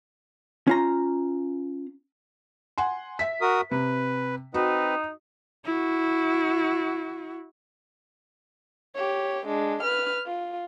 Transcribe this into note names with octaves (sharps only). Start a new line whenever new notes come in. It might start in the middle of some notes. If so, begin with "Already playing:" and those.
C#4 F4 A#5
F#5 G#5 C6
E5 B6
F#4 A#4 D#6
C3 B4
C4 D#4 F#4 B4
E4 F#4
G4 C#5
G#3 D4
B4 F6
F4